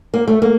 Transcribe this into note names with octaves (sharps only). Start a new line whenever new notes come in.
A#3
A3
A#3